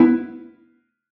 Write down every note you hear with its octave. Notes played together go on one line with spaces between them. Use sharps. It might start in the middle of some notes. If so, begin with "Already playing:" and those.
Already playing: B3 E4